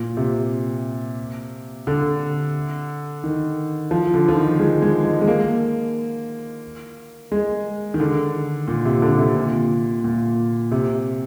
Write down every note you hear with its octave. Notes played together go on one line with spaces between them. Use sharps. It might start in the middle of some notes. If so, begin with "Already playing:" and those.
Already playing: A#2
C3
D3
D#3
F3
D3
F3
D#3
G#3
G#3
G#3
G#3
A#3
G#3
D#3
D3
A#2
C3
D3
C3
A#2
A#2
C3